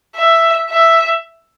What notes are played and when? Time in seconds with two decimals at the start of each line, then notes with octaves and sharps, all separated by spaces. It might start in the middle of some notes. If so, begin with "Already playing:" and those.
0.16 E5
0.70 E5